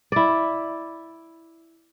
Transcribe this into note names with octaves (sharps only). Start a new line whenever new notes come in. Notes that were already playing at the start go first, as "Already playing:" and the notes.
E4 D5